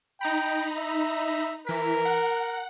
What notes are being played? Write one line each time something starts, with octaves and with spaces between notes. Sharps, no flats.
D#4 G5 A#5 B5
E5
E3 A#4 B6
F#5